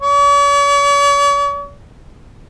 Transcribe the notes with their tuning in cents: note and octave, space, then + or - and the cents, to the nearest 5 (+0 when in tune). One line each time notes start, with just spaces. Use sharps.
C#5 +45